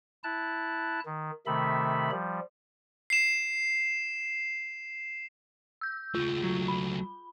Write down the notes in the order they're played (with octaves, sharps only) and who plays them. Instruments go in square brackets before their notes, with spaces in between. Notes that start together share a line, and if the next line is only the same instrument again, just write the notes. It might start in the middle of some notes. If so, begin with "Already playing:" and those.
[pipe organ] E4 A5 F#6
D#3
C3 D#3 A3 E5 B5
F3 G3
[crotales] C7 E7
[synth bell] E6 G6
[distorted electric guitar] C#2 A3 [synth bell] F4
[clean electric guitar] F#3
[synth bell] B5